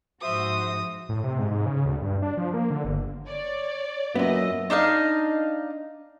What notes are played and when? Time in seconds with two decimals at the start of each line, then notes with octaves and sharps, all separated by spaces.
0.21 G#2 F3 F#4 C5 E5 D#6
1.09 A2
1.24 C3
1.39 G#2
1.51 G#2
1.66 C#3
1.85 D2
2.02 G2
2.22 D4
2.37 F3
2.54 A#3
2.71 D3
2.85 G1
3.25 C#5 D5
4.15 F#2 A#2 B3 C#4 D#5 E5
4.70 D4 D#4 D#5 F5